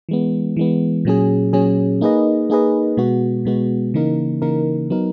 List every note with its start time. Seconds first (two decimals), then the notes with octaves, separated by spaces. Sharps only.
0.09 E3 G#3 B3
0.57 E3 G#3 B3
1.05 A#2 F#3 C#4 G#4
1.53 A#2 F#3 C#4 G#4
2.01 A#3 D#4 G#4 B4 D#5
2.50 A#3 D#4 G#4 B4 D#5
2.97 B2 G#3 B3 F#4
3.45 B2 G#3 B3 F#4
3.94 C#3 E3 A#3 D#4 A#4
4.42 C#3 E3 A#3 D#4 A#4
4.90 F#3 B3 D#4 A#4